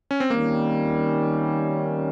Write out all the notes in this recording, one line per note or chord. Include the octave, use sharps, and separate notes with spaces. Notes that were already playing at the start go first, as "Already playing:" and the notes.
C#4
C4
D#3 G3 A#3 C#4